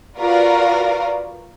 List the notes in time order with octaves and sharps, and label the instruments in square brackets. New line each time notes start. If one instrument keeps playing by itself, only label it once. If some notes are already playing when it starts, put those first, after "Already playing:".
[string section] F4 F#4 A#4 B4 D5 F5